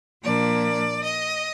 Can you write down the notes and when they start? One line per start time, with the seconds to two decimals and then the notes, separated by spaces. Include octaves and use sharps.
0.23 A#2 F3 A#3 D4 D5
1.02 D#5